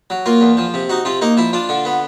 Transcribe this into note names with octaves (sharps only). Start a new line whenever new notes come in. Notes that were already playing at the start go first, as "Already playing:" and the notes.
F#3
A#3 F4
E2
F3
C3
D#4 F#4
C3 F4
A#3 D#4
F3 E4
D4 F4
D3
B3